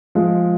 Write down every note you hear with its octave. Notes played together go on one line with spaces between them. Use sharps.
F3 G#3